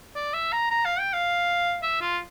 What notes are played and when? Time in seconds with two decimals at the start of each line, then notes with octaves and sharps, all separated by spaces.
0.15 D5
0.34 E5
0.52 A#5
0.71 A#5
0.85 F5
0.99 G5
1.13 F5
1.83 E5
2.01 F4